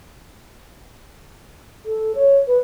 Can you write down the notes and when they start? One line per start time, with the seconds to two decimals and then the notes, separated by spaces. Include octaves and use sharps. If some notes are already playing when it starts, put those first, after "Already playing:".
1.86 A4
2.15 C#5
2.47 B4